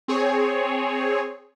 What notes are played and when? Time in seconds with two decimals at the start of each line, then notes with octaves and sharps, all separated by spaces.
0.08 C4 G#4 C#5